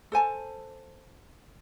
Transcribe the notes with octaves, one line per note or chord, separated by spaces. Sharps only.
A4 C5 G#5 A5